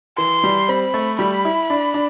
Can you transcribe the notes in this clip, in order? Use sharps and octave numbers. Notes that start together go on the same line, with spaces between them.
E3 C6
G3
C4 B5
A3
G3 B5
E4
D4
D4